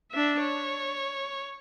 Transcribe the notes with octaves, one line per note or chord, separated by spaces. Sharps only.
D4 E5
C#5